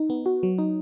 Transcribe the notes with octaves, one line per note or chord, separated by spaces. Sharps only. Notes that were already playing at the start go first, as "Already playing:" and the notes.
Already playing: D#4
B3
F#4
F#3
D#4